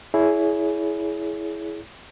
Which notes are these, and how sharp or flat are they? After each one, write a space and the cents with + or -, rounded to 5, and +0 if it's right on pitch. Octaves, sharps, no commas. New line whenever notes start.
E4 +0 G#4 +15 C#5 +35